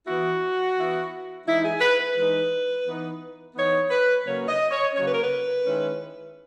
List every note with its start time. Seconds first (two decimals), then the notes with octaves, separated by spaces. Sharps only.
0.06 E3 B3 E4 F#4
0.76 E3 B3 E4
1.46 E3 G#3 D#4 E4
1.63 G#4
1.81 B4
1.99 B4
2.16 E3 G#3 D#4
2.86 E3 B3 D#4
3.55 E3 B3 D#4 C#5
3.90 B4
4.25 C#3 F#3 A#3 C#4 C#5
4.48 D#5
4.71 C#5
4.95 C#3 F#3 A#3 C#4 C#5
5.04 B4
5.13 A#4
5.23 B4
5.64 D#3 G#3 C#4 E4